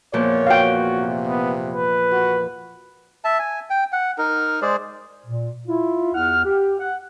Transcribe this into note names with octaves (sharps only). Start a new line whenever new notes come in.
E2 A#2 F3 C#5
F#4 F5 G5
C3
B3
B4
F#4
E5 A5
G#5
G5
F#5
D#4 A#4
G#3 G#4 C5 D5
A#2
E4 F4
E2 F#5 F6
G4
F#5